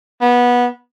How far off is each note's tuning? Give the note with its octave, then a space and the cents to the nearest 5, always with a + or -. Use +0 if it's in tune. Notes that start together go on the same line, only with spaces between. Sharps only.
B3 -20